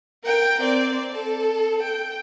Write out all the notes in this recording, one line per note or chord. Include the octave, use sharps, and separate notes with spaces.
A#4 G5
C4 D5
A4
G5